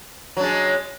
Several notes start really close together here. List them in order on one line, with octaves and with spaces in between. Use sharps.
F#3 D4 G#3